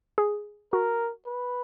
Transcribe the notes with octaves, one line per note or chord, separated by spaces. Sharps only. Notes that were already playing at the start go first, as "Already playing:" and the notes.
G#4
F#4 A#4
B4